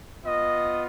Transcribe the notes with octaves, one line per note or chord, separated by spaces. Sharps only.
B3 F4 D#5